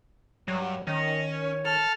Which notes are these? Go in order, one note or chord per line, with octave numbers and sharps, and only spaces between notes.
G2 F#3
D#3 C#4 D#5
C#5
A4 A5 F6